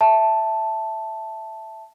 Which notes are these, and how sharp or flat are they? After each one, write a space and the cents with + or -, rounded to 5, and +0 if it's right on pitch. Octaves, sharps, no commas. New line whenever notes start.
E5 +0 A5 +0